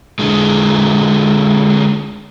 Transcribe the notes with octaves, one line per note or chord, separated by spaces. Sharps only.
D3 G#3